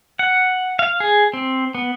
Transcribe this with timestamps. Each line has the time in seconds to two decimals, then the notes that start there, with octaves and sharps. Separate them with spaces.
0.19 F#5
0.79 F5
1.00 G#4
1.33 C4
1.75 B3